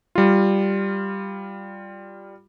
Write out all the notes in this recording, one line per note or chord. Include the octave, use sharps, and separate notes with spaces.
G3 F4